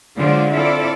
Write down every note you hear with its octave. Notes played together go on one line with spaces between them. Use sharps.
D3 F#3 G#3 F4 C5 D5
C4 E4 F4 A4 D5